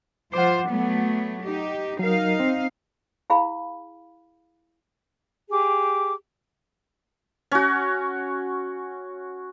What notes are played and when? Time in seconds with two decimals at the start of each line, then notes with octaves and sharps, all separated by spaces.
0.34 F3 F4 C5 F#5 D6
0.68 F#3 A3 B3
1.43 D#4 G4
1.99 F#3 D#4 A#4 F5
2.40 C4
3.30 E4 G#4 F5 B5
5.50 G4 G#4 D6
7.52 C#4 F#4